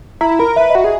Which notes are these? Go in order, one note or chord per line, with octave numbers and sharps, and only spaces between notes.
E4 A#5
A#4 B5
B4 E5
D#5
F#4 E5
G#4